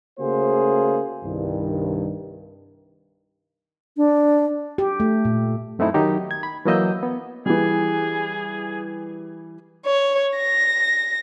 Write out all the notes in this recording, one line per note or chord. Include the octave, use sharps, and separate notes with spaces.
C#3 A3 A#3 F#4 G#4 C5
C2 G2 D#3
D4
G4
A3
A#2
F#2 A3 C4 D#4 E4
D#3 F#3 D#4 G4
G#6
B5
E3 F#3 A#3 D#5 E6 G6
B3
E3 G3 G#4
C#5
A#6